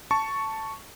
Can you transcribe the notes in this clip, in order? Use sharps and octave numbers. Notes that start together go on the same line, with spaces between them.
A5 C#6